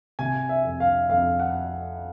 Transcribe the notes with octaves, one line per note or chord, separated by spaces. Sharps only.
C3 G#5
E5
F2
F5
F2 F5
F#5